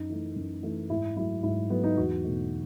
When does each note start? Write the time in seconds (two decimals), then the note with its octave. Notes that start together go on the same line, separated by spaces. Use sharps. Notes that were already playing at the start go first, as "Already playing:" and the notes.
Already playing: F#2 D#4
0.10 E3 A3
0.36 F#2
0.63 E3 A3
0.90 G#2 E4
1.16 F#3 A3 E4
1.43 G#2 E4
1.70 F#3 A3 B3
1.84 D#4
1.97 E2 F#4
2.24 B2 A3